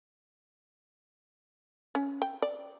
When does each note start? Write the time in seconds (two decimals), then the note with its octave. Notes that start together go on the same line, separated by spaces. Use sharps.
1.95 C#4
2.22 G5
2.42 D5